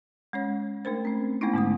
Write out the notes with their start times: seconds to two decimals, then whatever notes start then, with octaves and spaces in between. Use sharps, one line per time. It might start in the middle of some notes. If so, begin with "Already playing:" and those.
0.33 G#3 C#4 C#5
0.85 A3 D4 A#4 C5
1.05 C4 C#4
1.41 G#3 A3 B3 C#4 D#4 E4
1.54 G#2 D3 G#3 D#6